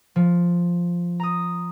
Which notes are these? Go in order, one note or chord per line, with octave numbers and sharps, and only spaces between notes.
F3
A#5 D#6